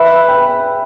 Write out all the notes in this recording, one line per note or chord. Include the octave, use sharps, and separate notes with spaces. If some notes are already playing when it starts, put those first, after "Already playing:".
Already playing: B4 E5
G5